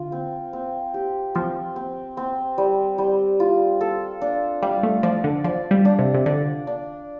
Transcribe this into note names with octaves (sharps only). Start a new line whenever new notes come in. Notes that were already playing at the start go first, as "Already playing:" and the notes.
Already playing: D3 F4
C4
C4
G4
F3 C4
C4
C4
G3
G3
F4
A4
D4
G3 F5
A3
F3 D5
D3
F3 D5
G3
D4
C3
C3
D3 D5
D4